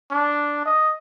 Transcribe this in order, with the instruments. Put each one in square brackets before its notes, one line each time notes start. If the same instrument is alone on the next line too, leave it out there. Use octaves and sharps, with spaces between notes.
[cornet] D4
D#5